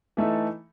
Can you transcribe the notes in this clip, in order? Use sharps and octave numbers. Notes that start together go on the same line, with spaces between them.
E3 A3 D#4 A4 E5